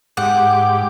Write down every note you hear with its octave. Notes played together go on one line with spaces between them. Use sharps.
G#2 G4 F#5 D6